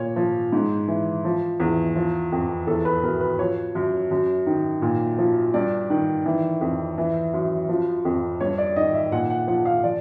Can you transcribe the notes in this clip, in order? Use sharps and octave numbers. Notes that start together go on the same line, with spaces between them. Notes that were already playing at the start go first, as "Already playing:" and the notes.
Already playing: A#2 C#5
F3
G#2
E3
F3
E2
F3
F2
E2 A4
B4
B2 A#4
B4
F3 C#5
F#2
F#2
D#3
A#2
F3
G2 D5
D#3
E3
F2
E3
F#2
F3
F2
G2 C#5
D5
D#3 D#5
E5
A#2 F#5
F#5
F3 F#5
F5
F3 D5